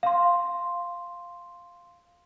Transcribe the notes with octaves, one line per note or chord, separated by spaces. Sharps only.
F5 C6